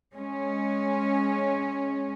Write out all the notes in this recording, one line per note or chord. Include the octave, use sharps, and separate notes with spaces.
G#3 C#4